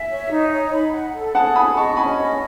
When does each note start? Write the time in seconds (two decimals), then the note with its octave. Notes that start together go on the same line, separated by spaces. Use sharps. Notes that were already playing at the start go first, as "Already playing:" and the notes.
Already playing: E5 G#5
0.10 C#5
0.30 D#4
0.51 C#5
0.72 B5
0.93 F#5
1.13 A4
1.34 G#4 F#5 A5
1.56 F#5 B5 D#6
1.76 D#5 A5 C#6
1.97 C#4 G#5 B5
2.18 D#5